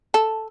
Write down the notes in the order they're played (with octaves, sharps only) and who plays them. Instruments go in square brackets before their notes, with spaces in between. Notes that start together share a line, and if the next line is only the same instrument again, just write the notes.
[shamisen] A4